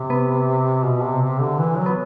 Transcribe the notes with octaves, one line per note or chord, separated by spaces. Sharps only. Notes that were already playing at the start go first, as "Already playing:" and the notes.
Already playing: C3
B3
B2
C3
C3
D3
E3
F#3
B3